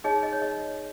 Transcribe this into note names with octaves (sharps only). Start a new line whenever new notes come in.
D#4 G#4 C#5 D#5
D#5
C#5
D#5